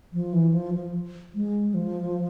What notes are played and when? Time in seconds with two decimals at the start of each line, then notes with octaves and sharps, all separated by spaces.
0.13 F3
0.33 E3
0.53 F3
0.74 F3
1.35 G#3
1.74 F3